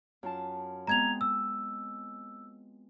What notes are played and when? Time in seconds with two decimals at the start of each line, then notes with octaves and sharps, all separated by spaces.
0.23 F#2 F4 A5
0.87 G#3 B3 C4 A#5 G#6 F7
1.21 E6